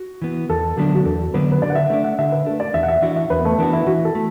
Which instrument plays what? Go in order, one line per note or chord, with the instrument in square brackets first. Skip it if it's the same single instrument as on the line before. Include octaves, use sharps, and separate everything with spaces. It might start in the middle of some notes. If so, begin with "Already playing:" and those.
Already playing: [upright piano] F#4
[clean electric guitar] E3 B3
[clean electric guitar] E2 [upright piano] A4
[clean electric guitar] D3 F#3 B3 D4 [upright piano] A4
[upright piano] F#4
[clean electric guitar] E2 [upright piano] A4
[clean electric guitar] D3 F#3 B3 D4 [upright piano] B4
[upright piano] B4
[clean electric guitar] D3 [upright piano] D5
[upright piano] F#5
E5
[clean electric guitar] A3 D4 [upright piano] E5
[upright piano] F#5
[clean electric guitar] D3 [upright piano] E5
[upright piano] B4
[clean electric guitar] A3 D4 [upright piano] A4
[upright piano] D5
[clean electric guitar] E2 [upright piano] E5
[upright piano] F#5
E5
[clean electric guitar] E3 D4 F#4 [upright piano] E5
[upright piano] E5
[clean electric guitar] E2 [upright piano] B4
[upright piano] B3
A3
[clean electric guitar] E3 D4 F#4 [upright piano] B3
[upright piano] E4
[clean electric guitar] E3 [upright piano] F#4
[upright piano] A4
[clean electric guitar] A3